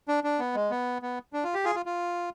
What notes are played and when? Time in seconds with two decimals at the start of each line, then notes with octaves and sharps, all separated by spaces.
0.08 D4
0.24 D4
0.39 B3
0.55 G#3
0.71 B3
1.02 B3
1.33 D4
1.44 F4
1.54 G4
1.65 F4 G#4
1.75 F4
1.86 F4